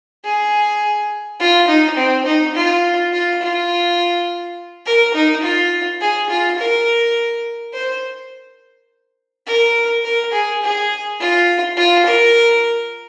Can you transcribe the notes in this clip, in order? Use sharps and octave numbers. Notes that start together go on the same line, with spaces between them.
G#4
F4
D#4
C4
D#4
F4
F4
F4
A#4
D#4
F4
G#4
F4
A#4
C5
A#4
A#4
G#4
G#4
F4
F4
A#4